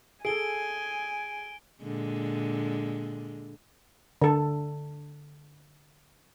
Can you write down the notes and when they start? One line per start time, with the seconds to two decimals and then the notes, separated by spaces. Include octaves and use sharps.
0.25 G#4 A4 G#5 D7 G7
1.82 A#2 D3 G#3
4.22 D3 A4